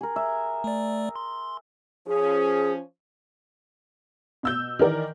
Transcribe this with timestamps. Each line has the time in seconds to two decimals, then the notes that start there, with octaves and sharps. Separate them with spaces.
0.01 G#4 A#4
0.16 E5
0.64 A3 D5
1.16 C6
2.07 F3 C#4 G#4
4.43 B2 E6 G6
4.79 D#3 E3 A#4 D5